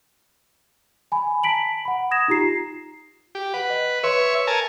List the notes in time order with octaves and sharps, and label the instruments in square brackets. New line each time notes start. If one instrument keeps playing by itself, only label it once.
[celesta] G#5 B5
A5 A#5 B6 D7 F#7
F#5 B5
D#6 G#6 A#6 E7
D#4 F4 G4 A#5 C7
[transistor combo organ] G4
[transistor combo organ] B4 [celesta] F#5
[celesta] D#5
[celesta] B4 C6 [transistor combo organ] C#5 E5
[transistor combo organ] A#4 G#5 A5